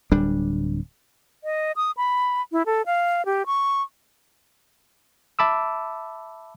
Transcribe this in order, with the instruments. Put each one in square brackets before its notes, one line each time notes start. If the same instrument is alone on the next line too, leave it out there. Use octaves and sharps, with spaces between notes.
[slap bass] D1 G3 D4
[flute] D#5
D#6
B5
E4
A4
F5
G4
C#6
[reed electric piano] E5 A5 B5 D6 E6